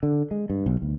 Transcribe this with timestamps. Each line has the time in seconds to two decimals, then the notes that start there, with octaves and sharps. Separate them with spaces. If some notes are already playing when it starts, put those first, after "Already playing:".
0.03 D3
0.31 G#3
0.50 G2
0.66 B1
0.82 D2